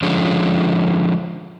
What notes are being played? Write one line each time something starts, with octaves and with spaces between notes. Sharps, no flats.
D3 F3 G#3 C#4